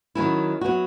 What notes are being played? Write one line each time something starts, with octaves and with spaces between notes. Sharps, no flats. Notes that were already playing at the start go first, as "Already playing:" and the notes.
D#3 F#3 C#4 E4
F#3 B3 F#4